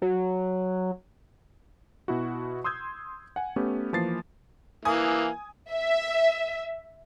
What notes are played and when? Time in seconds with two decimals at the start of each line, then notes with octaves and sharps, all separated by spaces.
0.02 F#3
2.08 B2 E4 F#4
2.64 C6 D#6 E6 G6 G#6
3.36 F#5 G#5
3.56 A3 B3 C#4 G4
3.93 E3 F3 A#3 A6 C7
4.85 E3 A#3 G#5 D#6
5.72 E5